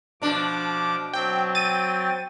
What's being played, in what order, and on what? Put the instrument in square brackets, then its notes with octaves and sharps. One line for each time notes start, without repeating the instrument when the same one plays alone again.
[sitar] B2 D4 [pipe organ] F3 D6
[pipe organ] F#3 C4 [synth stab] G5
[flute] G5 [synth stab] A6 D#7